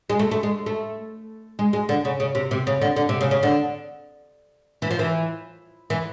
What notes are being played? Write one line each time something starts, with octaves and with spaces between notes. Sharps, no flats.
G#3
A3
A3
G#3
A3
G#3
G#3
D3
C#3
C#3
C3
C3
C#3
D3
D3
C3
C#3
C#3
D3
E3
F3
E3
E3